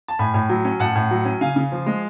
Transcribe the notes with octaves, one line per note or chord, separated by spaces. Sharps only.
A5
A2 G#5 B5
A2
F#3
C#4
A2 F#5 A5
A2
F#3
C#4
C#3 F5 G#5
C#3
F3
G#3